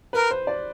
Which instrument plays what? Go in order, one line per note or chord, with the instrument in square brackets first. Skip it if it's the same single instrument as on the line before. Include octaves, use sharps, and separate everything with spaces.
[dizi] A#4 [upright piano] B4
[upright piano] C5
D5